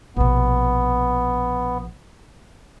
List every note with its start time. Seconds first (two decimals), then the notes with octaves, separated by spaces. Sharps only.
0.17 A#1 B2 B3